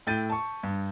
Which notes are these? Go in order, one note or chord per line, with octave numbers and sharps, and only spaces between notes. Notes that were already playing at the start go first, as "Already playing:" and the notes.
A2 G5 G6 A6 D#7
A5 C#6
G2